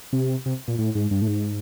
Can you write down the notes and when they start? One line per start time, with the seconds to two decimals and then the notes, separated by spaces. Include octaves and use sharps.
0.13 C3
0.46 C3
0.68 A#2
0.78 A2
0.95 G#2
1.11 G2
1.22 A2
1.27 G#2